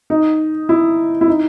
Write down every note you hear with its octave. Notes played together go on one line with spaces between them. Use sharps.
D#4
E4
E4
D#4